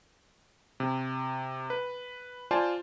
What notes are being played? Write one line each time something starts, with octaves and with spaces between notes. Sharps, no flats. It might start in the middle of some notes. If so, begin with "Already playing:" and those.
C3
B4
F4 C5 D5 G#5 A5